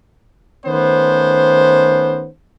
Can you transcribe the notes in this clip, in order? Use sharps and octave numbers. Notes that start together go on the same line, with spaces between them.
D#3 A3 B3 C#4 C5